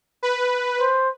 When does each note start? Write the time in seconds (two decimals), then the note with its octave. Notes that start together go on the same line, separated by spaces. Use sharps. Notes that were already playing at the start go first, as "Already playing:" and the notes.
0.23 B4
0.81 C5